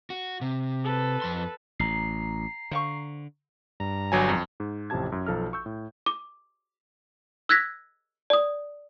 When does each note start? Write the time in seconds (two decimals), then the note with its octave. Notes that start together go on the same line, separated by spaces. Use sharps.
0.10 F#4
0.41 C3
0.84 A4 B4
1.22 F2 C6
1.80 A1 A#5 C7
2.71 D3 C5 F5 C#6
3.80 G2 A#5
4.12 G1 F#3 G#5
4.29 F2
4.60 G#2
4.90 A1 F2 C3 G4 A5 G#6
5.12 F#2
5.26 B1 F3 A4 A#5 F6
5.53 C#6 E6 G6
5.66 A2
6.06 D6
7.49 E6 F#6 G#6 A#6 B6
8.30 D5 D#6